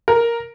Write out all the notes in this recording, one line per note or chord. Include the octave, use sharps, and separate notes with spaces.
A#4